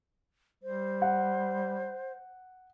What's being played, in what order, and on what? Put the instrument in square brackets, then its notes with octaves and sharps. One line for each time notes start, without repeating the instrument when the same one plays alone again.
[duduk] G3 [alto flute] C5
[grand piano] F#5